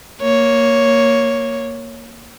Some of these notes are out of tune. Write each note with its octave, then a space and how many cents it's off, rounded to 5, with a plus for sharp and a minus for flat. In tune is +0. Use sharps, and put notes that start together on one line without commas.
A#3 +0 C#5 +0